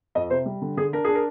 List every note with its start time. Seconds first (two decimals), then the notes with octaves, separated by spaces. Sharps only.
0.15 F2 D#5
0.30 C3 C5
0.46 G3
0.62 D3
0.77 D3 G#4
0.93 D4 A#4
1.04 D4 G#4
1.15 A#4